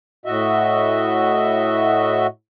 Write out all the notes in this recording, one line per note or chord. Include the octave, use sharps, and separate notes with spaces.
A2 F#4 D#5 E5